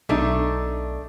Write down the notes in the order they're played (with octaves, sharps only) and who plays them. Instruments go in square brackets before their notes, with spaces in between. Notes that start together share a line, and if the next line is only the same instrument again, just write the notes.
[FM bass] B1 [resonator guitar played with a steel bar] A3 D4 D#4